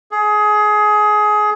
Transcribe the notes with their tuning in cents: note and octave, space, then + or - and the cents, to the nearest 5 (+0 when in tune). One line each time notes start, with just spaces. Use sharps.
G#4 +20